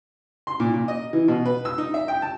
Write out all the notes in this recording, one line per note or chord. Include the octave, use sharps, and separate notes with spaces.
C6
A#2
A#2
D#5
E3
B2
B4
E6
D#4
E5
G5
A5